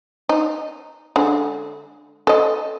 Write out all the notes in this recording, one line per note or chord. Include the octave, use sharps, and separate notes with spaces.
D#4
D3 G#3
A4 D#5